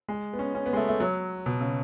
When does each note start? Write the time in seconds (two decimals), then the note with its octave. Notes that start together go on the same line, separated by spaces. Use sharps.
0.08 G#3
0.33 B3
0.39 C#4
0.55 C#4
0.66 B3
0.73 G#3
0.77 A3
0.89 A3
1.00 F#3
1.46 B2
1.61 C#3